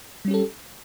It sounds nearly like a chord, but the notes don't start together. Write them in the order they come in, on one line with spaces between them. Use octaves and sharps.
G3 C#4 G4 A4